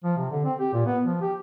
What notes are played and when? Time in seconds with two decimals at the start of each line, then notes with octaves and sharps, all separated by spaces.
0.04 F3
0.17 C3
0.31 D3
0.45 C4
0.59 G4
0.73 A#2
0.86 B3
1.05 F3
1.22 G4